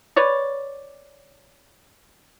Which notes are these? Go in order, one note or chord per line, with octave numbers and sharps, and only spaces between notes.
B4 C#5 D5